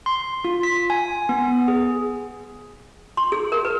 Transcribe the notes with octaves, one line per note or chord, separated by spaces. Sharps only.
C6
F4
B6
G#5
B3
G#4
C6
G#4
A#4
B4